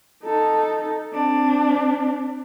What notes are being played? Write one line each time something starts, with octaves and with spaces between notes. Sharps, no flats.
D#4 A4
C4 D4